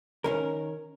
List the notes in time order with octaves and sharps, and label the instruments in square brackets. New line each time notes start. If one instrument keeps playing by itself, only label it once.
[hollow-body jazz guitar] D#3 C#4 A#4